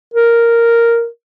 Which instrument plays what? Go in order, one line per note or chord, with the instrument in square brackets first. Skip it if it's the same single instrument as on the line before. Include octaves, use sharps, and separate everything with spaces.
[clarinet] A#4